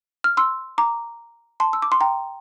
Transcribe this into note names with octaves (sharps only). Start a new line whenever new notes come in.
F6
C6 E6
A#5 D6
A5 C6
E6
D6
C6
G5 A#5